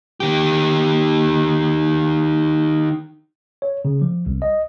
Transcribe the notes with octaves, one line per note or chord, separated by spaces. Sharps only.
D#3 G4
C#5
C#3
F3
C2
D#5